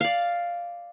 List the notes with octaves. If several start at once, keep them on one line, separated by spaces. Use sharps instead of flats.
D5 F5